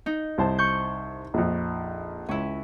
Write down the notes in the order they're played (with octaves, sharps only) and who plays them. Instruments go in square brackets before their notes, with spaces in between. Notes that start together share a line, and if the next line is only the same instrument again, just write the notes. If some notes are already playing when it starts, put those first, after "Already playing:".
[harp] D#4
[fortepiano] C2 C5 A5
[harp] C#6 G6
[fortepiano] A#1 F2
[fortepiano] C#2 [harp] C#4 E4